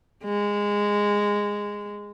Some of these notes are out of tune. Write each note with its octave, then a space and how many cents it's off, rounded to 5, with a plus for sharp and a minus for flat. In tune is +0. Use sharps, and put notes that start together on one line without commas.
G#3 -15